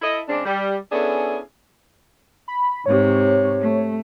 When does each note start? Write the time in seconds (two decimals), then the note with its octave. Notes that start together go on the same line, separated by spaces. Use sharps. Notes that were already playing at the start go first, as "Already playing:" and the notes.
0.02 E4 A4 D#5
0.28 C#3 G#3 C4 D4
0.45 G3
0.92 B3 C#4 D4 E4 G#4 A4
2.48 B5
2.86 G#2 C3 C#5
3.61 A3